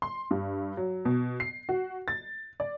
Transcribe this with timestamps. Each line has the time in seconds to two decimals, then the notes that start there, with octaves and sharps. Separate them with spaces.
0.02 C6
0.31 G2
0.77 F#3
1.05 B2
1.40 C7
1.69 F#4
2.08 A6
2.60 D5